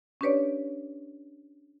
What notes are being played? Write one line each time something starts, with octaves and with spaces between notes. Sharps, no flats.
C#4 D4 G4 B4 C#5 D5